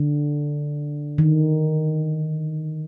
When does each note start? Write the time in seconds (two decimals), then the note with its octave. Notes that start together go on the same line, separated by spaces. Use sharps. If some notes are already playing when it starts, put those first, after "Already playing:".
Already playing: D3
1.18 D#3